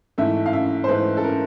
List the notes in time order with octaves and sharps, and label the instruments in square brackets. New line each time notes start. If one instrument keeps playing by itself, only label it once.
[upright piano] G#2 E3 A3 E5
F5
E5
C5
G#2 E3 A3 B4
A4
A#4